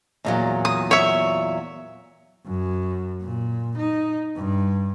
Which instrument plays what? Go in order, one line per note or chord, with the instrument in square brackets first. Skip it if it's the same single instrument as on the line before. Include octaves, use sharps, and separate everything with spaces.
[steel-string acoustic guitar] E2 A#2 F#3
[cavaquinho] D#6
C#5 E5
[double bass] F#2
A#2
D#4
G2